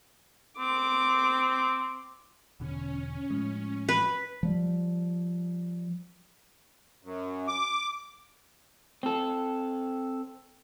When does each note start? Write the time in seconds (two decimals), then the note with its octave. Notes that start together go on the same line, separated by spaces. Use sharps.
0.59 C4 D6
2.60 E1 B2 D3 C#4
3.30 A2 F3 G#3
3.89 B4
4.43 F3 G3
7.03 F#2
7.48 D6
9.03 C4 A4